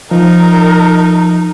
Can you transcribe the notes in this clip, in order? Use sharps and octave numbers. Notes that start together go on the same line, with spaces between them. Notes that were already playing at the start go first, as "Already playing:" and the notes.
F3 D#4 A#4